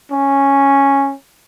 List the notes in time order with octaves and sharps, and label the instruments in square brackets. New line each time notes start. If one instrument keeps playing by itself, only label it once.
[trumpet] C#4